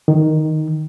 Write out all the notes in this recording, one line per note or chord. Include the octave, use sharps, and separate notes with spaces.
D#3